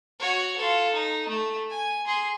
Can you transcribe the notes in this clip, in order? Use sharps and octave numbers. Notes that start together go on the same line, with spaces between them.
F#4 C#5
F4 A4
D#4
A3
G#5
G#4 C6